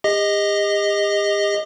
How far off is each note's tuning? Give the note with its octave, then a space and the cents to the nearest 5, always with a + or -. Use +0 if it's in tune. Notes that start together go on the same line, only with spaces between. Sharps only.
G4 +45 D#5 +5